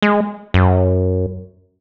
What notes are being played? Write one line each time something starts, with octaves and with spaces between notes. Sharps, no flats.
G#3
F#2